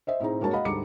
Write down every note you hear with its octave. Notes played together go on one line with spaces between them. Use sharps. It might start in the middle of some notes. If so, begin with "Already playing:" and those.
C5 D#5 E5
A2 C4 D#4 G#4 C5 A#5
G2 G#3 A#3 F#4 C#5 A5
D#5 F5 F#5 B5
D2 G#2 G3 A#5 D6 C#7